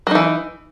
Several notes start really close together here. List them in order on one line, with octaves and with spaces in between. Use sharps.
F#3 D#4 E3